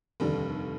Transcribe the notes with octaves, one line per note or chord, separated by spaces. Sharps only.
F1 D#2 D3 G3